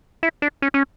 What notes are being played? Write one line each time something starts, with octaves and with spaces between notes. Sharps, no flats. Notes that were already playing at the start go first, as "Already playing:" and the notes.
E4
D4
C#4
C#4